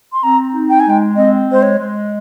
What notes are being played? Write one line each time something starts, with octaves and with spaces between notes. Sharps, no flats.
C6
C4 A#5
D#4
G5
G#5
G#3 G5
C4 D#5
G#3 C5
C#5
G#3